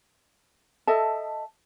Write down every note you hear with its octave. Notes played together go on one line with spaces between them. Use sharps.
A4 D#5 E5 A5